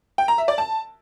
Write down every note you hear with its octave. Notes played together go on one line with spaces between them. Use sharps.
G5
A#5
E5
D5
A5